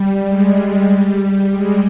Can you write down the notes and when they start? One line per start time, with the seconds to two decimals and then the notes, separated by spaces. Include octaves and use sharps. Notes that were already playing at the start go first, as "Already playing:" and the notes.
Already playing: G3
0.28 G#3
0.58 G3
0.89 G3
1.51 G#3